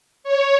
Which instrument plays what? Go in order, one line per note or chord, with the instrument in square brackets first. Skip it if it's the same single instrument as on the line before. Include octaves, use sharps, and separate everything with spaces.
[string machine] C#5